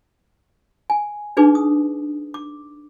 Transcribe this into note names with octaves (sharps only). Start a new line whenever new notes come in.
G#5
D4 D#4 G#4 B4 D6
D#6
D6